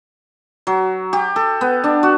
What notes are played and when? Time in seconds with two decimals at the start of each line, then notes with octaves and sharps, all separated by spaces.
0.67 F#3
1.13 G4
1.36 A4
1.61 B3
1.84 D4
2.03 F#4